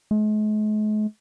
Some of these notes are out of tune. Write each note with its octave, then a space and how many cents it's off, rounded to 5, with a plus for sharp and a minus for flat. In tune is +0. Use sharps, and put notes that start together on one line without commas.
G#3 +45